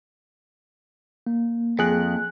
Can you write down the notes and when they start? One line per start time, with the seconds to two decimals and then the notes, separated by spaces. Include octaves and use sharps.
1.27 A#3
1.79 F2 G#4 F#6